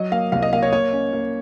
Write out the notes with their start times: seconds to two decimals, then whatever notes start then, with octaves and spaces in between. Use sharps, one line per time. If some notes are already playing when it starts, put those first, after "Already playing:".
Already playing: F#3 D#5
0.12 A#3 F5
0.32 C2 F5
0.43 D#5
0.52 A#3 F5
0.62 C#5
0.73 A#3 C#5
0.93 C#4
1.13 A#3